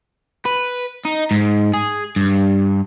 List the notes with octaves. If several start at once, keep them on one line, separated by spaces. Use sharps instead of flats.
B4
D#4
G#2
G#4
G2